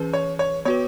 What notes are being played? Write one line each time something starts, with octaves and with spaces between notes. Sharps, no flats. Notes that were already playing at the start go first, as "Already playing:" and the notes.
Already playing: E3 C#4 G#4 B4
C#5
C#5
B3 F#4 B4 C#5